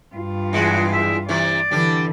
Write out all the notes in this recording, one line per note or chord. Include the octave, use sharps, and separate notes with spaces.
G2 F4
E2 G#3 F#4
E5
C3 E3 D5
D3 E3 G3 D4